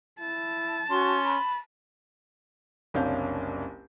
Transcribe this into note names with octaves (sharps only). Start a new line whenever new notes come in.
E4 A5
C#4 F#4 C6
B5
F#1 C2 C#4 D4 F5 G6